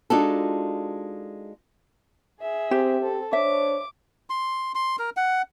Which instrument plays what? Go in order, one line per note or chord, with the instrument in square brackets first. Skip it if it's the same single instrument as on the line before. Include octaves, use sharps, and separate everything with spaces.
[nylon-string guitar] G#3 D4 D#4 F4 F#4 A4
[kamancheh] G#4 E5
[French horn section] C4 [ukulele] G4
[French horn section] C4 [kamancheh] A4
[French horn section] D4 C5 C#5 [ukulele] E5 [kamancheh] D6
[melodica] C6
C6
A#4
F#5